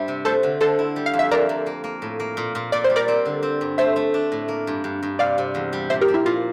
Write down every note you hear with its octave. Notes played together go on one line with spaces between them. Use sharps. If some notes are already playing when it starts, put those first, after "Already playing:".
Already playing: G2 G3 D4 C5 E5
C3
A3 A4 C5
D3
D3 A4 C5
E4
G3
F5
F2
E5
F2 A#4 D5
F2
A#3
A#3
A2
A#3
A#2
A#2
A#2 D5
C5
G3
A#4 D5
C4
D3
C4
G2
A3 C5 E5
A3
D4
A2
A#3
G2
G2
G2
C3 D5 F5
C3
E2
G3
A#2 C5 E5
G4 A#4
F3
E4
A#2 F4